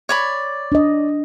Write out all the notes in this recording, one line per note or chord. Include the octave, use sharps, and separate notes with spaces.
C#5 D5 B5
D4 D#5